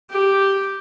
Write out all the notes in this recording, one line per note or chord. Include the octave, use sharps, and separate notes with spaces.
G4